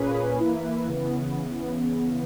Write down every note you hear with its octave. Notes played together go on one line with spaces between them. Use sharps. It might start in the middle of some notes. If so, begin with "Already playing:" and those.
Already playing: A#2 A#3 C#4 G#4 B4
E3 A#3 E4 B4
C#3 E3 B3